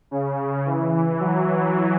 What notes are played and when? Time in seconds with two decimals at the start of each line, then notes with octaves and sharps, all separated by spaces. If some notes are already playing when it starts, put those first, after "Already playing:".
0.11 C#3
0.66 E3
1.20 F#3